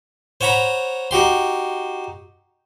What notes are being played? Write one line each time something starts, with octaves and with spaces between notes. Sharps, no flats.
C5 C#5 F#5 A#5 B5
D#4 F#4 G4 C6